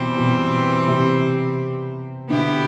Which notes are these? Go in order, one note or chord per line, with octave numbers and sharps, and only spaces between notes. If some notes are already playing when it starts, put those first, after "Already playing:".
Already playing: B2 E3 G3 C4
B2
C3
B2 D3 B3 E4 G4